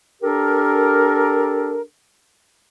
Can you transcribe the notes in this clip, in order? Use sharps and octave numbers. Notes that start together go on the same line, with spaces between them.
D4 G4 A4 A#4